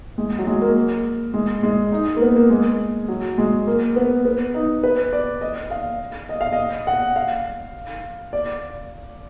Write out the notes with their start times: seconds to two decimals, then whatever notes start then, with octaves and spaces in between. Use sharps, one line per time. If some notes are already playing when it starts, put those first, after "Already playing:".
0.18 G#3
0.39 F#3
0.47 G#3
0.62 A#3
1.34 G#3
1.63 G#3
1.92 D#4
2.17 A#3
2.22 B3
2.36 A#3
2.50 G#3
3.09 F#3
3.38 G#3
3.67 A#3
3.96 B3
4.25 B3
4.54 D#4
4.83 B4
5.13 D5
5.41 D#5
5.71 F5
6.29 D#5
6.41 F5
6.53 D#5
6.87 F#5
7.16 F5
8.33 D5